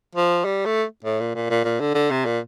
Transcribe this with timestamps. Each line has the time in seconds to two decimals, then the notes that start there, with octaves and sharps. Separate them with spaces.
0.15 F3
0.45 G3
0.66 A3
1.05 A2
1.20 A#2
1.35 A#2
1.50 A#2
1.65 A#2
1.80 D3
1.95 D3
2.11 C3
2.26 A#2